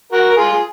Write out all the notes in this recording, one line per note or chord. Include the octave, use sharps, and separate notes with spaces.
F#4 A#4
A#4
F4 G#4
G#4